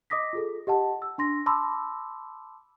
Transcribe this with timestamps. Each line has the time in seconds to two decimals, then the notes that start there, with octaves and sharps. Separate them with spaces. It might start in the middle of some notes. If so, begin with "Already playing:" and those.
0.10 D#5 D6 D#6 A#6 B6
0.33 F4 G#4 A4
0.67 G4 D#5 F#5 A5
1.02 E6
1.18 D4 C6 A#6
1.46 A5 B5 C6 D6 E6